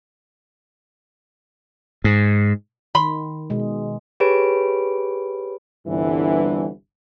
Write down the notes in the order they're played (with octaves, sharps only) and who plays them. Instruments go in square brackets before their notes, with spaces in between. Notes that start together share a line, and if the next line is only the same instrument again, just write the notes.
[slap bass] G#2
[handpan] D#3 [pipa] B5 C6
[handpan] B2 G#3
[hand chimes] G4 G#4 B4 C#5 B5 D7
[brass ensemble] G1 C2 G2 D3 E3